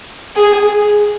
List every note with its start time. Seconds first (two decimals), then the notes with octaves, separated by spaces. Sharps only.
0.36 G#4